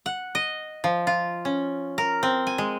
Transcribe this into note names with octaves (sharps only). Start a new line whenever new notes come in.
F#5
D#5
F3
F4
C#4
A#4
C4
G#5
G#3